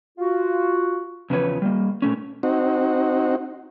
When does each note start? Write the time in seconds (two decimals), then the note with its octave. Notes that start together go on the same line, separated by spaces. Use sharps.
0.18 F4 F#4
1.30 E2 C#3 F3 A#3 B4 C#5
1.62 G3 A#3
2.02 A#2 A3 C#4
2.43 C4 D#4 F#4